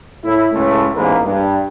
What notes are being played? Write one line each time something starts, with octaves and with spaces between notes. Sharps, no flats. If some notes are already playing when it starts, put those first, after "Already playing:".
A2 E4
C#2 A2 A3
A1 E2 G#2 A#3 A#4 B4
G2